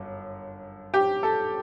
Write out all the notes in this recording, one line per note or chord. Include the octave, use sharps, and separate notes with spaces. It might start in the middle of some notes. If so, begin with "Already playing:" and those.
Already playing: G1 F#2
G4
A4